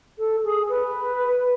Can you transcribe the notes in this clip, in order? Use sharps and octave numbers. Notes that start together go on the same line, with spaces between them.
A4
G#4
B4